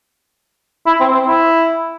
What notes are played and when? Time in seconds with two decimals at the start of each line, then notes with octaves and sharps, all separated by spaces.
0.87 E4
1.00 C4
1.14 C4
1.27 E4